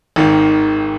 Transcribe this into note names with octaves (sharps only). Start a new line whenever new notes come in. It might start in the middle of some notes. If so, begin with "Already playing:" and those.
G#1 G#2 D#3